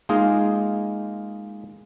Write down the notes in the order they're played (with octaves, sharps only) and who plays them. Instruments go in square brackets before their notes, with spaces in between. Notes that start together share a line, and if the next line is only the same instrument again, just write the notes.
[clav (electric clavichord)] G#3 A#3 D#4 F4 G#4 A#4